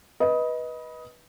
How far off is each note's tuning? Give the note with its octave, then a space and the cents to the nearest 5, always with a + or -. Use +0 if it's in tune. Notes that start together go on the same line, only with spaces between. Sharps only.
B4 -15 D#5 +15